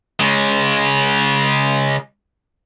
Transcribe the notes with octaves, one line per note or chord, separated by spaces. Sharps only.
C#3 G#3